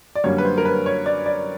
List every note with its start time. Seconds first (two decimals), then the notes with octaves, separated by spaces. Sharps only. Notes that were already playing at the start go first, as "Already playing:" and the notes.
0.15 D5
0.24 F#2 D3 G3 A#3 C#5
0.38 B4
0.45 C5
0.57 A#4
0.65 B4
0.86 C#5
1.06 D5
1.26 D5